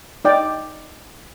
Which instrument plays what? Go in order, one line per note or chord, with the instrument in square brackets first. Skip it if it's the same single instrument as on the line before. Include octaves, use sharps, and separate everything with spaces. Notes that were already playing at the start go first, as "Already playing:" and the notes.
[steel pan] D#4 D5 G5